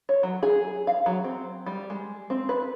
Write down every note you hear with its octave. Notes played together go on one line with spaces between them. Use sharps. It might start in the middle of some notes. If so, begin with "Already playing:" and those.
C#5
F#3
G#4
F5
F#3
C4
G3
G#3
C4
B4